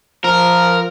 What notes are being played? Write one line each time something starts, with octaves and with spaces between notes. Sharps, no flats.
F3 A#4